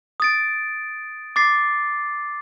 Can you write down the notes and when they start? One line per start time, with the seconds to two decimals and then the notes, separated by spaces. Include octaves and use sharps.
0.20 D#6 A6 D7
1.36 D6 A6 C7